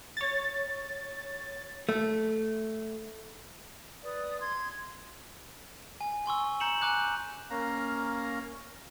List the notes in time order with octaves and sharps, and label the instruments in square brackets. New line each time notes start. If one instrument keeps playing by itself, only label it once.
[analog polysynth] C#5 A6
[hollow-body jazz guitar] A3
[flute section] B4 D5 D#6
C6 G#6
[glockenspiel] G#5
G#5 C6 C#6 E6
A#5 G6 C#7 E7 F#7
G#5 A#5 D6 F#6 G6
[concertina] A#3 C#4 F5 A#5